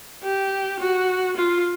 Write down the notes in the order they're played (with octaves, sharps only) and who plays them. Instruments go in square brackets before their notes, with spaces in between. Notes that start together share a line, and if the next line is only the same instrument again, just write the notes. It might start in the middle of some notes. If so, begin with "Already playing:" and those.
[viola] G4
F#4
F4